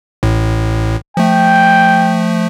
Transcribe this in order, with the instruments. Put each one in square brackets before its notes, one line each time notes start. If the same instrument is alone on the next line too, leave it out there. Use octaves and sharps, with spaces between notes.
[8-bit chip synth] A1 A2
[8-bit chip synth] F3 A3 [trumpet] G5